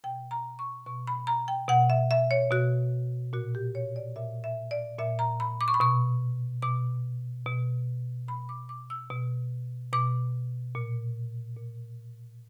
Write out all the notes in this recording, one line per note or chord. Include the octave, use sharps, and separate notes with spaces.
B2 G5
A#5
C#6
B2 C#6
B5
A#5
G5
B2 F#5
E5
E5
C#5
B2 F#4
A#2 F#4
G4
C#5
D5
A#2 E5
E5
D5
A#2 E5
A#5
B5
D6
C#6
B5
B2 C#6
B2 D6
B2
B2 B5
D6
D6
E6
B2
B2 D6
A#2
A#2